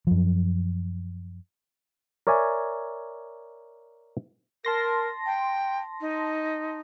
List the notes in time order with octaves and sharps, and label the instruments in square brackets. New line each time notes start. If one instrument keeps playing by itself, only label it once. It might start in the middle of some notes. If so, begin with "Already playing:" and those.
[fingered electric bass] F#2 F3
[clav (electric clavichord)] A#4 C#5 D5 E5 G#5
[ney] A#4 [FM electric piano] A5 C6 A#6
[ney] G5
D#4